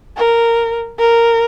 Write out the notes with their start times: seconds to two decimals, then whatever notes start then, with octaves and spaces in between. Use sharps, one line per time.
0.17 A#4
0.99 A#4